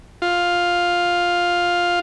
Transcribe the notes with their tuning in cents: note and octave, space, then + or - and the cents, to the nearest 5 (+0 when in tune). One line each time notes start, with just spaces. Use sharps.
F4 +5